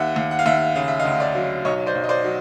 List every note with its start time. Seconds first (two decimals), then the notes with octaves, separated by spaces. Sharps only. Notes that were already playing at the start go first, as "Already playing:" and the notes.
Already playing: D#2 E5 F#5
0.16 D#2
0.31 F#5
0.39 F5
0.46 D#2 E5 F#5
0.75 C#3 F5
0.88 E5
0.99 D#5 F5
1.05 D2
1.20 D5 E5
1.35 F#3
1.65 B1 C#5 D#5
1.86 C5 D5
1.95 B1
2.04 D#5
2.09 C5 D5
2.24 F#3